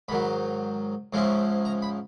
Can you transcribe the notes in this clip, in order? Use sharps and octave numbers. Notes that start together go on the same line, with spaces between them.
G#2 D#3 F#3 B5
G#2 F3 G#3 C#4 E4
A#5
B5